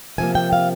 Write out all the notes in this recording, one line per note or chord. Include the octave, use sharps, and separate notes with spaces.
C3 F3 A#3 G#5
G5
F5